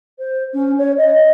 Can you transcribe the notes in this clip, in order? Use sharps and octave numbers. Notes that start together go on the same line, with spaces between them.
C5
C#4
C#5
D#5